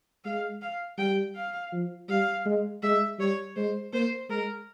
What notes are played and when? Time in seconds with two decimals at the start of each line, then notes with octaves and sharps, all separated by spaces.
0.25 G#3 F5
0.62 F5
0.98 G3 G5
1.36 F5
1.72 F3
2.09 G3 F5
2.46 G#3
2.82 G#3 E5
3.19 G3 C#5
3.56 G#3 C5
3.93 A#3 C5
4.29 G#3 A#4